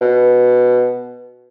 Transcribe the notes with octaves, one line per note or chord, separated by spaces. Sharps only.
B2